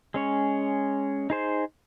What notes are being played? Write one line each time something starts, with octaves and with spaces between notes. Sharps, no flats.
G#3 C#4 C#5
D#4 G#4 C5